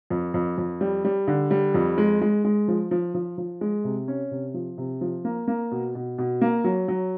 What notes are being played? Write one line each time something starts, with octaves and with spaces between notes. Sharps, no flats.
F2
F2
F2
G3
G3
D3
G3
F2
G#3
G#3
G#3
F3
F3
F3
F3
G#3
C3
C#4
C3
F3
C3
F3
A#3
A#3
B2
B2
B2
A#3
F#3
F#3